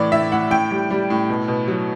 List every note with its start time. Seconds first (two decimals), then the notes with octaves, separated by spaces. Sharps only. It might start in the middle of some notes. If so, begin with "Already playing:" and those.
Already playing: A2 E3 D5
0.12 A2 E5
0.32 A2 F#5
0.50 A2 G5
0.71 G3
0.90 G3
1.10 A2
1.29 B2
1.48 B2
1.68 F#3